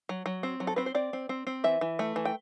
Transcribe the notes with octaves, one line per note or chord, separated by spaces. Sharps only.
F#3
F#3
C4
F#3
A4
C4 B4
C5
C4 D5
C4
C4
C4
E3 E5
E3
A3
E3
G5